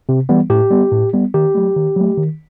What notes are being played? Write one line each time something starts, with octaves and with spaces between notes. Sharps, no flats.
C3
E3 G3 B3
A2 G4
G3 B3
A2
G3 B3
D#3 G4
F#3 A3
D#3
F#3 A3
D#3